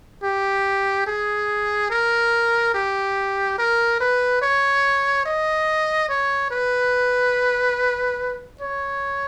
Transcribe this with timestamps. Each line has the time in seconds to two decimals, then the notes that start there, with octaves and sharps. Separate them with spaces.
0.23 G4
1.07 G#4
1.91 A#4
2.74 G4
3.58 A#4
4.00 B4
4.42 C#5
5.26 D#5
6.09 C#5
6.51 B4
8.61 C#5